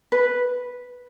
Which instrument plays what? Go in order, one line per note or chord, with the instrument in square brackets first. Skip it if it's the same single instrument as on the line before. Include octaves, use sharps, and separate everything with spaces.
[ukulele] B4